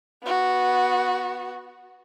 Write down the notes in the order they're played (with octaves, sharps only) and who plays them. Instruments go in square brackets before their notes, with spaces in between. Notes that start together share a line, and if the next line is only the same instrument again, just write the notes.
[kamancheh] B3 F#4